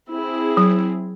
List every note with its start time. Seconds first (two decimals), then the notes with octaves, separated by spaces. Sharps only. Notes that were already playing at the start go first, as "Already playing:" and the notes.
0.09 C4 E4 G#4
0.57 F#3